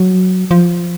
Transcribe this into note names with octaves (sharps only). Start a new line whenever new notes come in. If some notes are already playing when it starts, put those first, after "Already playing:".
Already playing: F#3
F3